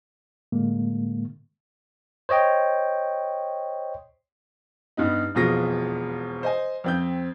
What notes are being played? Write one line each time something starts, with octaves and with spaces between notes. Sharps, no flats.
A2 D3 G#3 A#3
C5 C#5 D#5 G5
G2 B3 D#4
E1 F2 B2 F4 G#4 A#6
C5 D#5 G#5
F2 C4 G6